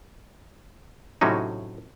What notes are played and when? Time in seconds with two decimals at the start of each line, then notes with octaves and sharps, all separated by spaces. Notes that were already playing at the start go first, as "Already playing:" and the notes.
1.21 A2 C3 F#3 C#4 D#4